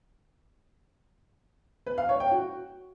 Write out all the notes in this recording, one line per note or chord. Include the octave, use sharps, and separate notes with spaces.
B4
F5
C#5
G5
F#4